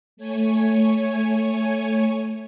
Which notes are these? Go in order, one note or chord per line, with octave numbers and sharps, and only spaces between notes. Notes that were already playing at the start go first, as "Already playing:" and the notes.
A3 C#5 G#5